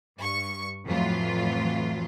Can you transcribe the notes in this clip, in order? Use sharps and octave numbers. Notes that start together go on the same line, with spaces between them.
G2 C#6
F2 A2 E3 F#3 F4